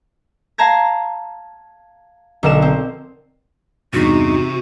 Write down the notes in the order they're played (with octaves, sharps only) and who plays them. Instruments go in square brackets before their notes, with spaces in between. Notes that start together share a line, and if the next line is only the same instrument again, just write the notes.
[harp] F5 A5 A#5 G#6 A#6
B1 D3 A#4 E6 E7
C4
[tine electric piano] E2 G2 [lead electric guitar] C3 [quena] D#4 [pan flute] F#4